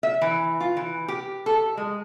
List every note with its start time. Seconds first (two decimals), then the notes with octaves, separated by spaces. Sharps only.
0.03 E5
0.22 E3
0.60 F4
0.77 E3
1.08 G4
1.46 A4
1.77 G#3